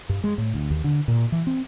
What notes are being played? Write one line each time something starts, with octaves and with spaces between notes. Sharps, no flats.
G2
G#3
A2
D2
D#2
D3
A#2
E3
C4